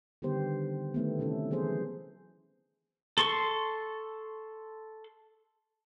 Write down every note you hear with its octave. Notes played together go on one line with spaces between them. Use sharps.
D3 D#3 G3 B3 G4 C5
D#3 A3 B3
C3 D#3 C#4 E4 A4
E3 F#3 B3 G#4 C5
A4 C6 C#6